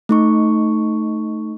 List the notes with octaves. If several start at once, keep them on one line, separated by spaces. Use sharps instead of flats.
A3 D#4 C#6